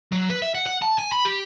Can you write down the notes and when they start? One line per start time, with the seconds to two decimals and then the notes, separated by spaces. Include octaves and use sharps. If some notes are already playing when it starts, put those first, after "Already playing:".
0.12 F#3
0.30 B4
0.42 E5
0.55 F#5
0.66 F#5
0.82 A5
0.98 G#5
1.12 B5
1.25 G4